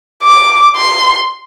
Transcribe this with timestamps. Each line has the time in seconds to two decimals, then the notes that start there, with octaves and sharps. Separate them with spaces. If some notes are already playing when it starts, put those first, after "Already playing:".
0.22 D6
0.76 C6